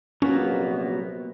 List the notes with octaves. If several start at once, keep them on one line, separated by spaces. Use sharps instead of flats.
A#1 C3 F#3 A#3 B3 C#4 F#4